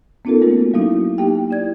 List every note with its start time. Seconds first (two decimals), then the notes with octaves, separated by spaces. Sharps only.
0.25 B3 C#4 D#4 F4 A4 A#4
0.41 A3 A#3 F#4 A#4
0.74 F#3 A#3 C#4 D#4 E4 F#4
1.18 A#3 D#4 G4 G5
1.51 E4 D5 G#6